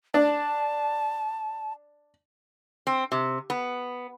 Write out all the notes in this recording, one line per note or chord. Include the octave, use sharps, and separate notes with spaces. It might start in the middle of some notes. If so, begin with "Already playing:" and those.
D4 A5
C4
C3
B3